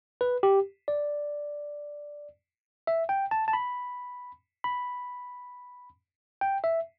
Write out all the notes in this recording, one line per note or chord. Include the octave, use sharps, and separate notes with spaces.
B4
G4
D5
E5
G5
A5
A5
B5
B5
G5
E5